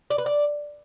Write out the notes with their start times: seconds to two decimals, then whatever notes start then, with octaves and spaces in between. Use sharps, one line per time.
0.10 D5
0.18 B4
0.26 D5